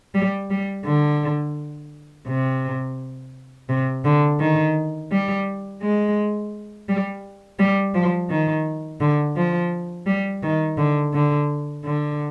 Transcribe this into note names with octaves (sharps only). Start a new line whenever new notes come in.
G3
G3
D3
C3
C3
D3
D#3
G3
G#3
G3
G3
F3
D#3
D3
F3
G3
D#3
D3
D3
D3